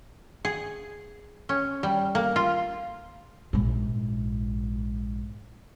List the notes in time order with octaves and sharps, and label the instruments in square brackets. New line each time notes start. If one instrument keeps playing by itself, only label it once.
[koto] G#4
C#4
G3
A#3
F4
[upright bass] A#1 G#2